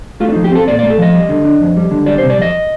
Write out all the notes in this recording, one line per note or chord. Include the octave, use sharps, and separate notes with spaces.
A3 F4
D4
F3 D#4
G4
C4 A4
A#2 D5
A3 D5
A4
F3 D#5
G3
D3
D4
F2
G3
D3
G3 D5
C3 C5
D5
F2 D#5